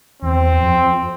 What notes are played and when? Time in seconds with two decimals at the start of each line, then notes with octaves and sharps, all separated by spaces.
0.22 E2 C4
0.59 F2